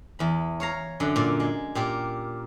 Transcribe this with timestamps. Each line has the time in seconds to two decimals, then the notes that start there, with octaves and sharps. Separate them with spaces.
0.19 E2 B5
0.60 C#5 F5 A#5
1.00 F#2 D3
1.16 A#2
1.40 G#3
1.75 A#2 G4 A#4